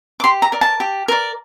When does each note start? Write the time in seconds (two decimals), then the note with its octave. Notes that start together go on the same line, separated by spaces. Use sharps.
0.20 D6
0.24 G4 C6
0.42 A#5
0.52 A#4 D5
0.61 A5
0.80 G4
1.08 A#4 D5